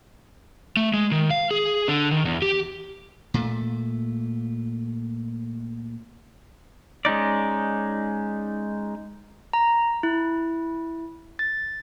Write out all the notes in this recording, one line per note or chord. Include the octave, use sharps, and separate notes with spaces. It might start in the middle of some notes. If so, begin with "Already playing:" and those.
A3
G#3
D#3
F5
G#4
D3
D#3
E2
G4
A#2 A3
G#3 C#4 D#4 D5
A#5
E4
A6